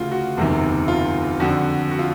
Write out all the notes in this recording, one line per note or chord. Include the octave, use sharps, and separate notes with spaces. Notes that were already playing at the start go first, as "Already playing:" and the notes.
Already playing: D2 C#3 E3 F4 F#4
F#4
F#1 E2 C3 D#3
F4
F2 D3 F3 F#4
F#4
F4